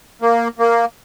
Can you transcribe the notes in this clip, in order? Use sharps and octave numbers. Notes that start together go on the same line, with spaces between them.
A#3
A#3